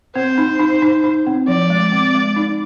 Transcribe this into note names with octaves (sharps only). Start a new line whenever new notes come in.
C4 C5
D#4
D#4
D#4
D#4
C4
F3 D5
G#3
C4
G#3
D#4